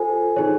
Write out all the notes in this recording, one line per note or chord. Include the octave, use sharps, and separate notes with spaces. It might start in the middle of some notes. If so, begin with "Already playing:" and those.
Already playing: F4 A4 C5 G#5
D#4 G#4 C#5